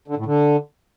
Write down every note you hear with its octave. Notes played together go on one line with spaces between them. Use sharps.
D3
A2
D3